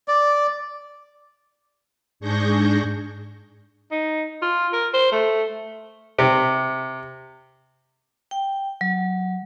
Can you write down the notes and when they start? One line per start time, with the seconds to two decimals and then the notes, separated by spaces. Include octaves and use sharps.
0.08 D5
2.20 G#2 D4 G#4 C#6 G6 A#6
3.91 D#4
4.42 F4
4.73 A#4
4.94 C5
5.12 A3
6.19 C3
8.31 G5
8.81 F#3